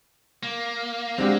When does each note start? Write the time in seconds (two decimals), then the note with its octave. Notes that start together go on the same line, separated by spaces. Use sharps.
0.43 A#3
1.18 G3 G#3 C4 D4 F#4 G4